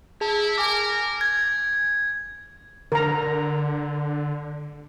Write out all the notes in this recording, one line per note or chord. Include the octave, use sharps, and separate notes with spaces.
E4 G#4 A5
A#4 G#5 D6
G#6
D3 A#4 A#5